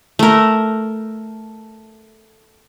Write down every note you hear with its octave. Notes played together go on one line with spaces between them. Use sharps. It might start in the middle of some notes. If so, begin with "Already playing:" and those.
A3 A#4